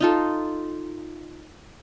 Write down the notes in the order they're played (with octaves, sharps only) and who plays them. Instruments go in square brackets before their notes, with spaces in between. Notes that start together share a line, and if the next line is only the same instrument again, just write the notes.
[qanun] D#4 F4 A4